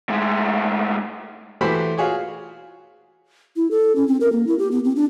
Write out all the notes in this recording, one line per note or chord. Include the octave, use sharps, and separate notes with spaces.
A2 G#3
E3 A3 F#4 G4 C5 B5
F4 F#4 G#4 C#5
E4
A4
C#4
C4
A#4
A#3
E4
G4
B3
C4
D4